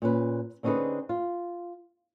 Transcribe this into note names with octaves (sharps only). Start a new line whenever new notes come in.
A#2 C#4 B4
D3 C4 C#4 D#4 G#4 B4
F4